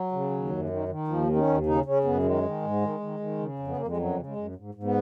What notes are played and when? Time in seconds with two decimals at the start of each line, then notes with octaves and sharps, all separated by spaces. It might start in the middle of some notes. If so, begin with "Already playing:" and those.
Already playing: F#3
0.12 C#3
0.30 D#2
0.49 F#2
0.69 D#3
0.88 D#3
1.08 D#2 F3
1.27 D#3
1.36 C#4
1.47 D#2
1.66 C#3 D#4
1.85 C#3 C#4
2.04 F#2 B3
2.23 D#3 G#3
2.43 D#3
2.62 G#2
2.82 D#3
3.00 D#3
3.20 D#3
3.39 C#3
3.59 F2
3.67 B3
3.77 F2 A#3
3.88 G#3
3.97 F#2 F#3
4.16 C#3
4.26 G#3
4.36 F#2
4.55 G#2
4.75 G#2
4.83 B3